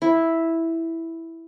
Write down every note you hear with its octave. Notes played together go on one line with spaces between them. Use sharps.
E4